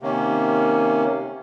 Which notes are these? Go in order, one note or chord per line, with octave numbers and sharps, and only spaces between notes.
C3 D#3 A#3 C#4